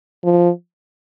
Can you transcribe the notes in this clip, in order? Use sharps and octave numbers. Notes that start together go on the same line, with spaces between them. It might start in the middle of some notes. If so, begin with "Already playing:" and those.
F3